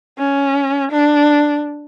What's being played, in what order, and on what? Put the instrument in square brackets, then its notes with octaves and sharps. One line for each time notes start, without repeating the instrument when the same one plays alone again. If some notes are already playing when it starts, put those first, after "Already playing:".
[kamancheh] C#4
D4